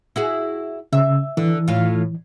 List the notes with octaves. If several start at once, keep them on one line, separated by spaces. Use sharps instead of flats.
E4 F#4 G#4
C#3 E5
D3 E3
A2 F4